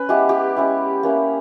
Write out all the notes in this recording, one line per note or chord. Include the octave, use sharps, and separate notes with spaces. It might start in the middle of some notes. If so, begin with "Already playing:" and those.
Already playing: C#4 B4
G#3 B3 E4 G4
G4
G#3 C#4 E4
A#3 C#4 E4